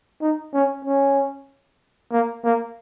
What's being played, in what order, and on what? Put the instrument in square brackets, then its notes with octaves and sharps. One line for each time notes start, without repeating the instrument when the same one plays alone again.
[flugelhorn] D#4
C#4
C#4
A#3
A#3